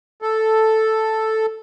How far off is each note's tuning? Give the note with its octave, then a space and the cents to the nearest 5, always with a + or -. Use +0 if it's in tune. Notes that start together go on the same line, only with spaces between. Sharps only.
A4 +0